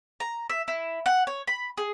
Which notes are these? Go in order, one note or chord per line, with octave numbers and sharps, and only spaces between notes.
A#5
E5
E4
F#5
C#5
B5
G#4